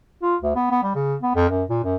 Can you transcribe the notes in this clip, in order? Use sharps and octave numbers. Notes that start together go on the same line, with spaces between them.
F4
D2
B3
B3
G3
C#3
B3
F2
F#2
A#2
F#2